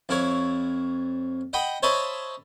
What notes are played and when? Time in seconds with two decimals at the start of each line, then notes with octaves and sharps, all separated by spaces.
0.09 F2 E4 C#5
1.53 D#5 F#5 G5 B5
1.83 C5 C#5 D#5 E5 A5 B5